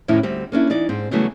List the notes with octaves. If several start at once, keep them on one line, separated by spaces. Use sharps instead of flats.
F2 A2 D#3 C#4 E4
D2 G3 C4
A#3 C#4 D4 E4
E3 D#4 D5
G#2 C4
C#3 E3 F#3 G3 A3 B3